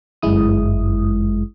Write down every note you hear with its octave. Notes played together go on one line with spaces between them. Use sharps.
G1 F#2 G#3 E4 D#6